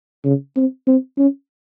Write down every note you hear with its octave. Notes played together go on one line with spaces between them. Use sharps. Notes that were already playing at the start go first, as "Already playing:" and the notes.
C#3
C4
C4
C#4